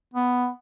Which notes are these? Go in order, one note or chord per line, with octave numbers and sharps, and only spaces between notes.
B3